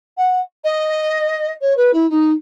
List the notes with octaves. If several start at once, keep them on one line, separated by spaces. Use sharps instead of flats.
F#5
D#5
C#5
B4
E4
D#4